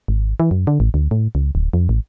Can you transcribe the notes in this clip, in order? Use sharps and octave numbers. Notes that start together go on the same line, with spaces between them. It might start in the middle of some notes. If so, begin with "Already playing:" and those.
G#1
E3
F#2
D3
A1
D2
A2
C#2
D1
F2
A1